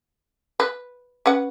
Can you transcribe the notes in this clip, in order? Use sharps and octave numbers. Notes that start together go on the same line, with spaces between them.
B4
C#4 B4 F#5